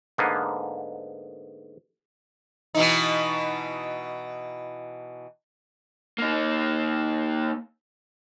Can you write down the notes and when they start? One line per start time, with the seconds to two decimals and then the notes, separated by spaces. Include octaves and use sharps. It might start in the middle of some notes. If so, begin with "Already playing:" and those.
0.18 G#2 D3 A#3 B3
2.75 B2 E3 D#4
6.18 A#3 D#4